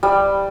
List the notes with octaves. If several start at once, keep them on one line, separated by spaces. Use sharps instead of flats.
G3